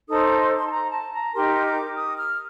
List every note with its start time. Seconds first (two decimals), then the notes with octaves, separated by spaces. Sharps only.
0.08 D#4 A4 C5 D#6
0.24 D6
0.40 C6
0.55 C6
0.67 A5
0.70 A#5
0.92 A5
1.13 A#5
1.34 D#4 G4 A#4 C6
1.65 D6
1.97 D#6
2.18 F6